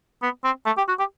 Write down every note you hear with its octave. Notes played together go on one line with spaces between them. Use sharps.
B3
C4
A3
G4
F#4
G4